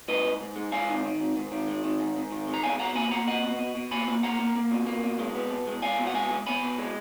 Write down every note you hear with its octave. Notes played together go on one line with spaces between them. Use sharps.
G#2 B4 D#5
G#2
G#2
G#3
G#3 F5 G#5
D#3
D#3
G#2
G#2
D#3
G#3
D#3
G#2
G#2
D#3
G#3
A#5
B2 F5 G#5
B2 F#5 A#5
A#3 G#5 B5
A#3 F#5 A#5
B2 D#5 F#5
B2
B2
B2
A#3 G#5 B5
A#3
A#3 F#5 A#5
A#3
A#3
B2
A#3
B2
G#3
B3
B2
G#3
G#3 F5 G#5
B2
F#5
G#3 F5 G#5
G#3
B3 G#5 B5
B2
G#3